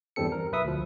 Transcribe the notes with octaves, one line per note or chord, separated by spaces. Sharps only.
E2 G2 G3 C4 A4 C#7
A#4
B1 B4 E5 D#6
D2 F3